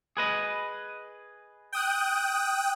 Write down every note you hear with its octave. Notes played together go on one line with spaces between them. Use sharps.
G#4 B4 D#5
G5 D#6 F#6